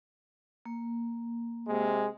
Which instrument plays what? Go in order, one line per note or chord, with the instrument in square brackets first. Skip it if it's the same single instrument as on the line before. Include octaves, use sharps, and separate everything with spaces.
[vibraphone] A#3
[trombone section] C3 G#3